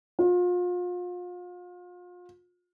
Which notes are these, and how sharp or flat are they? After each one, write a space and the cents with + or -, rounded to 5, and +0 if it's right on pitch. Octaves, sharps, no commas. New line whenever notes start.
F4 +35